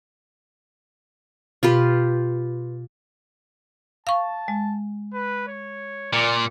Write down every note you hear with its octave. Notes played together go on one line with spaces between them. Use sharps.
B2 F4 G4 B4
F5 A5 C#6
G#3
B4
C#5
A#2 D5